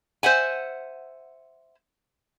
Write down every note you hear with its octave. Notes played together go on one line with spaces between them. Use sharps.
C5 E5 F#5 G#5